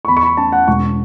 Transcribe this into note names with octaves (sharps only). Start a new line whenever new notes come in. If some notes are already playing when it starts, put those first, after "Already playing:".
C#6
E2 B5
C#6
B5
C#4 A5
F#5
E1 C#6